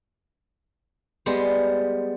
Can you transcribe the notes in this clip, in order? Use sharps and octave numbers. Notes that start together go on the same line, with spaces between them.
G3 G#3 B3 G4 C5